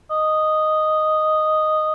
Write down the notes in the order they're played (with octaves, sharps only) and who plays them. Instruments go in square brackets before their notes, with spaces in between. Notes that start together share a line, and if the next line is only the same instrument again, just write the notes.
[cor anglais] D#5